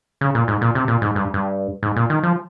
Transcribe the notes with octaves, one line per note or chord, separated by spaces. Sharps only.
C#3
A#2
G#2
A#2
C3
A#2
G#2
G2
G2
G#2
A#2
D#3
F3